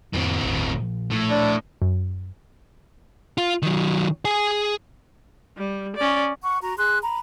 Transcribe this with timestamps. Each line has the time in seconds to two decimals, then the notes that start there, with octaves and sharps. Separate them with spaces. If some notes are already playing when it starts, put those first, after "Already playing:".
0.14 F2 A2 A#3 C4
0.43 G1 D#2
0.77 A#2 F3
1.11 A2
1.29 D4
1.82 F#2
3.38 F4
3.63 D#3 F#3
4.25 G#4 G#5
5.57 G3
5.97 C#4 D5
6.43 F#5 C#6
6.62 F#4 A#5
6.77 G#4 C6 F#6
7.02 A#5 B5